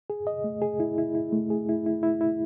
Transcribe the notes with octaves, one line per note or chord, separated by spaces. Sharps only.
G#4
D#5
A3
G#4
E4
E4
E4
A3
G#4
E4
E4
E4
E4